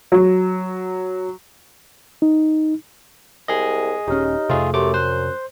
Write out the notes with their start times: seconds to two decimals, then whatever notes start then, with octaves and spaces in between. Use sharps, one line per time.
0.12 F#3
2.22 D#4
3.48 C2 G#4 D#5
4.08 D#1 C#4 D#4 G4 C#5 F6
4.49 F2 C3 A3 F4 G#4
4.74 F#2 A3 G4 C6 D6
4.94 C5 F#6